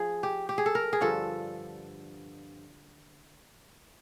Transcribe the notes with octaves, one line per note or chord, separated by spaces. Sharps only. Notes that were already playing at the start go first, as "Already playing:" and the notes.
Already playing: F3 G#4
G4
G4
G#4
A4
A#4
G#4
G2 D3 F3 A4